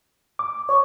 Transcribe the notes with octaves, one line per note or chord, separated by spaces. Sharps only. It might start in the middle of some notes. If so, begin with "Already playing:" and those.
D6
C#5 C#6